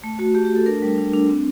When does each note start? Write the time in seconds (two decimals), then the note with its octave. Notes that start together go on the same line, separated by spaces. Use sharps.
0.04 A3
0.19 A3 F#4
0.35 A3 G4
0.45 G4
0.50 A3
0.56 A4
0.66 D4 A#4
0.82 G3
0.98 D4
1.14 D4
1.29 C4